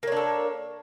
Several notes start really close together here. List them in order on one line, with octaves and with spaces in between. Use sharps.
A#3 C#5 D4 A4